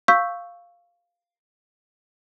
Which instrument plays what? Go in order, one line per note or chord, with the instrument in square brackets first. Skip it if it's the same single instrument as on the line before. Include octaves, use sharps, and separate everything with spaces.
[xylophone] F5 C#6 E6 G6 B6